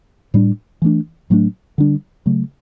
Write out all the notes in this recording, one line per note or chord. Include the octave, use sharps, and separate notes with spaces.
A2 G3 D4
E3 A3 D4
A2 F#3 A3 D4
D3 G3 D4
C#3 F#3 A3